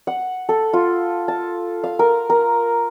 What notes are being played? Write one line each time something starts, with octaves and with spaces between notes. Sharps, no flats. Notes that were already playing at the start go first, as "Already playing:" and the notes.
F#5
A4
F4
A5
F5
A#4
A#4